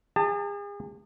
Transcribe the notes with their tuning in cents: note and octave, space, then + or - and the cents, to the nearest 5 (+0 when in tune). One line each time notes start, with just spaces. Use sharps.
G#4 -40 A5 +30